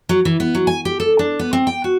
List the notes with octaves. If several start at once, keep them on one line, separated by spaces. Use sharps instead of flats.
F#3
E3
B3
F#3
G#5
G4
A4
D4
B3
C4
G5
F#4